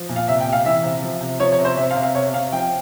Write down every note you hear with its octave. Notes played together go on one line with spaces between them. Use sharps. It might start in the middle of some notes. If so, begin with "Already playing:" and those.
Already playing: F3
A#2
F5
C3 E5
G5
C3
F5
E3 E5
C3
F3
C3
F3 C#5
C#5
C3
C5
C3 E5
F5
C3
F5
C3 C#5
C3 F5
F3 G5